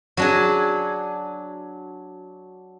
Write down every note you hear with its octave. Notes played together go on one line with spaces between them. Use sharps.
F#3 D4 G#4